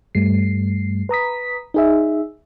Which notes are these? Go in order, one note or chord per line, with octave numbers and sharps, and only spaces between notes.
G2 G3 A3 C7
B4 A#5 D#6 B6
D#4 G#4 E5